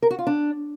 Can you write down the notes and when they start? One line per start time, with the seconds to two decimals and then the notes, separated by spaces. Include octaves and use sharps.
0.02 A#4
0.10 F#4
0.19 F4
0.27 D4